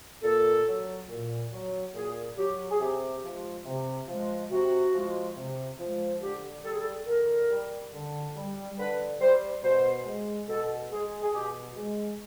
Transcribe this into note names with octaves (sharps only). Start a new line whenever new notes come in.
A#2 A4
F#3
A#2
F#3
A#2 G#4
F#3 G4
G#4
C3 G4
F3 G#3
C3
F3 G#3
C3 F#4
F3
G#3
C3
F3 G#3
D3 G4
G3 A4
G#4
A4
D3 A#4
G3
D3
G3
D3 B4
G3 C5
B2 C5
G#3
B2 A4
G#3 G#4
G#4
B2 G4
G#3